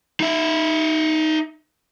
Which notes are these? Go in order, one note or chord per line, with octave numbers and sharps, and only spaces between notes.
D#4 E5